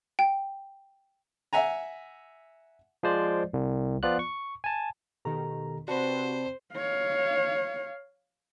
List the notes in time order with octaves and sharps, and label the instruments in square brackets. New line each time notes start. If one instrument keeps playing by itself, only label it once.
[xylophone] G5
[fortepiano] E5 F#5 G#5 A#5
[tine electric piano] F3 G#3 C5 D5
C2
F3 B3 F4 D5 F#6
C#6
G#5 A5
[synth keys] B2 D#3 [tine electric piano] G4 A4 A#5
[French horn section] C3 C4 [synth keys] F#4 B4 [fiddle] C5 [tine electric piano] D5 A5 B5
[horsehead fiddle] C#5 F5